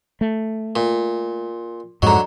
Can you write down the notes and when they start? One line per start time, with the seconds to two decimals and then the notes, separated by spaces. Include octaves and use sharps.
0.21 A3
0.76 A#2
2.02 F2 G#2 D3 F#3 D#5 A#5